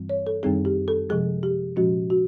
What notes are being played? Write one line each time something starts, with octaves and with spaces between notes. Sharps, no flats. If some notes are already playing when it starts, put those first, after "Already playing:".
Already playing: G2 E3 G3 C4
C#5
A4
F#2 D#3 G3 C4 D#4 G#4
G4
A4
C3 F3 G#3 G#4
G4
A#2 F3 G#3 C#4 F#4
F#4